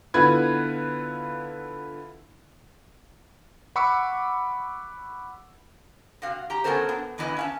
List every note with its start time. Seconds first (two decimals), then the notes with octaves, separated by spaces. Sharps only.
0.14 D3 B3 E4 F4 B4 G#6
3.76 F#5 B5 C#6 D6 E6 C#7
6.22 C3 F#4 F5
6.50 G4 A#5
6.64 F#3 B3 C#4 A4 A#4 C5
6.89 B3
7.18 E2 E3 B3 E4 D#5
7.37 C#4 F5 A5